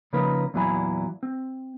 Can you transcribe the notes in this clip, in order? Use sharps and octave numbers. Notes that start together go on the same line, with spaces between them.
C#3 F3 A#3 D#4 A#4 B4
E2 A#2 F#3 E4 G#5 B5
C4